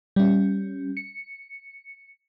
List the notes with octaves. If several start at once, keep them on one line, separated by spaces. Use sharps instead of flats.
G3 C#4
C#7